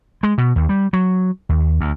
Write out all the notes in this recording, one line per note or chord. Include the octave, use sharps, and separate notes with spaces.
G#3
B2
D#2
G3
F#3
D#2
D2